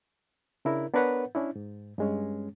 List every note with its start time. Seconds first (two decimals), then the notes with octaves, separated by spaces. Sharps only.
0.65 C#3 D4 E4 A#4
0.94 B3 D4 A#4 B4 C#5 F#5
1.35 C#4 D4 E4
1.56 G#2
1.98 G2 G#3 C#4